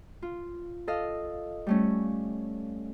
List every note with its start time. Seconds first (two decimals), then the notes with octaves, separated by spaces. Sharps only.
0.22 F4
0.87 A4 D#5 F5
1.67 G3 A3 C#4